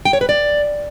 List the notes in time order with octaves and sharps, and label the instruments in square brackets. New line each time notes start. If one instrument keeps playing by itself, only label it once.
[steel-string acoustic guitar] G5
C#5
B4
D5